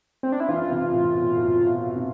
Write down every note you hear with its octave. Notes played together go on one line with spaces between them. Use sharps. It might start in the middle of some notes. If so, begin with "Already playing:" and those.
C4
D4
E4
E3 F4
C3
A2
B2
A2
B2
C3